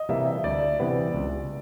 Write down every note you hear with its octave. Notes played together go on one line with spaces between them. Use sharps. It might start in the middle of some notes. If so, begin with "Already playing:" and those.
Already playing: D#5
C3 E3 G3 A#3 E5
E5
D2 D5
C3 E3 G3 B3
C#2